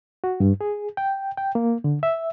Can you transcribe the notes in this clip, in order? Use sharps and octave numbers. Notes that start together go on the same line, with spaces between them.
F#4
G2
G#4
G5
G5
A#3
D3
E5